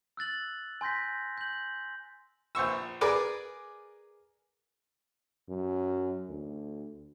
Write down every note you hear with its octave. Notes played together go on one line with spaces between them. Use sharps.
E6 F#6 A6 F#7
G#5 C6 G6 A#6 B6
G6 F#7
A#1 C5 C#6 E6
G#4 A#4 B4 D5
F#2
D2